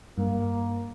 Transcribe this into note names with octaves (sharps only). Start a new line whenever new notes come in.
G2 A#3